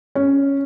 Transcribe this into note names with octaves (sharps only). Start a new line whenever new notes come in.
C#4